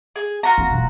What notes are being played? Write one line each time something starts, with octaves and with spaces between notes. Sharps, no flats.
G#4
F4 F#4 A#5
C4
D#1 B2